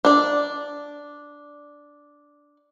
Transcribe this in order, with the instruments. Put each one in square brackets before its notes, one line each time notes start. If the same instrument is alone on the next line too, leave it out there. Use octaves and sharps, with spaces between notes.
[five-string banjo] D4 D5